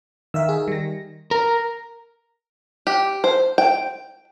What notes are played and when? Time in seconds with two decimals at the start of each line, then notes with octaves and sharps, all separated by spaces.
0.34 D#3 E5 F5 E6
0.49 G#4
0.68 G3 A#6
1.31 A#4
2.87 G4
3.24 C5
3.58 G5